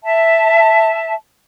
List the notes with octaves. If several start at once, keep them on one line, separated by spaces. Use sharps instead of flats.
E5 A5